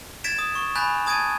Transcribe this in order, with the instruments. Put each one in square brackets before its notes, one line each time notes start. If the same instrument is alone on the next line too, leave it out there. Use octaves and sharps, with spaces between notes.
[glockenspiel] G#6 A6 B6 D7 E7
D#6
C#6
G#5 B5 F#6 G6 A6 B6
A5 D#6 G#6 A6 D7 D#7